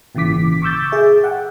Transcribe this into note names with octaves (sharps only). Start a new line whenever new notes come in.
G#1 A#2 C#3 E3 D6 B6
C#6 D6 E6 G6 A6
G#4 E5
F#5 G5